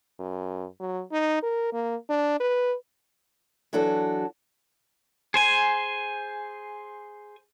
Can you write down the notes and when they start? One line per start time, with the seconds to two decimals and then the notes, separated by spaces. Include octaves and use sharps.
0.19 F#2
0.80 F#3
1.12 D#4
1.43 A#4
1.73 A#3
2.09 D4
2.40 B4
3.73 E3 F#3 D4 F#4 A4
5.34 G#4 C5 G#5